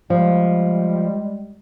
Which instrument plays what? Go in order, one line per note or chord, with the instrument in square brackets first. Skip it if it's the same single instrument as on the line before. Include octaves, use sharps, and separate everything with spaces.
[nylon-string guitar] F3 [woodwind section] G3 G#3